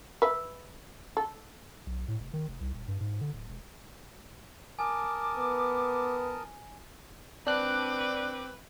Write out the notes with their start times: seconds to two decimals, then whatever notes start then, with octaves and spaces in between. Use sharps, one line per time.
0.22 B4 E5
1.17 A4
1.86 B1
2.08 A2
2.20 F1
2.33 D#3
2.48 F1
2.60 C2
2.73 D#1
2.88 G2
3.00 G#2
3.21 D3
3.33 D1
3.49 E1
4.79 A#4 G#5 A5 D6 D#6
5.37 B3
7.47 C4 D4 B4 D6 F#6